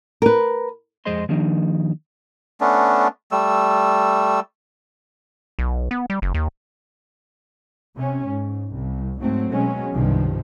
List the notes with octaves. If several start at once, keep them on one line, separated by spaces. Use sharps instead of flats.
A#4 B4
F2 G#3 G#4 C5 D#5 C6
D#3 F3 G3 A#3 D4 D#4
A3 B3 C#4 D4
G3 A3 E6
B1
B3
G3
F#1
D#2
C3 C#4
G#2
C2
G#2 F#3 A3 C4
B2 F#3 G#3 C#4
C2 G2 C3 D#3 F3